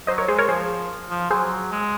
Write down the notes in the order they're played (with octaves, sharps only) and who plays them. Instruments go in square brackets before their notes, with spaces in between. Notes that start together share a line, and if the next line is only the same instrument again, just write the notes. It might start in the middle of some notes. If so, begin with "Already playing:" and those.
[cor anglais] F#3 [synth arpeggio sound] C5 D#5
[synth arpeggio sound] A#4 C#5
[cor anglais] G#3 [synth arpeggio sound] G#4 C5
[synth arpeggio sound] A#4 C#5
[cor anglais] F3 [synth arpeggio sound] G#4 C5
[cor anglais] F3
[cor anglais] F#3 [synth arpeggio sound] G#4 C5
[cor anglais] G#3